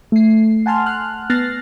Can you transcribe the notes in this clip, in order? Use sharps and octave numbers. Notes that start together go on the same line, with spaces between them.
A3 C7
F#5 G#5 A5 C6 F6
F6 F#6
B3 F6 F#6 A6 A#6 C7